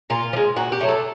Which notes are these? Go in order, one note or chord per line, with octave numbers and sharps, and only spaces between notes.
A#2 F4
F3
G#3
A#2 F#4
G4
F#3 A3
A4